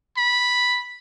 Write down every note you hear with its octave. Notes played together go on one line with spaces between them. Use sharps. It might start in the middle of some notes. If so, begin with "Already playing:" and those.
B5